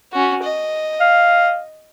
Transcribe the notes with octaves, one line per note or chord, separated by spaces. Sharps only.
C#4 F#4
D#5
F5